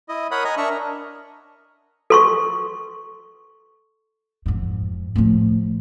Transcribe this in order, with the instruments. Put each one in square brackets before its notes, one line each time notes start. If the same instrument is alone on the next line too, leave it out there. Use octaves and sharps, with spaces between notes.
[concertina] E4 D#5
A#4 C#5 F#5 B5 D#6
D#5 G#5 A#5
D4 A#4 E5 C#6
A#4
[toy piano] A4 C6 C#6
[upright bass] F2 G#2
A2 F3